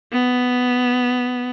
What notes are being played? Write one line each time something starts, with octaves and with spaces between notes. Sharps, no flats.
B3